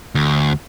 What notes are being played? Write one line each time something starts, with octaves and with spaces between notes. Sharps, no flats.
D2